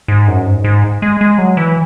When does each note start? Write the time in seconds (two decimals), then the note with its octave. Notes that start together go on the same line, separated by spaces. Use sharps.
0.08 G#2
0.28 F#2
0.46 G#2
0.64 G#2
1.02 G#3
1.21 G#3
1.38 F#3
1.57 E3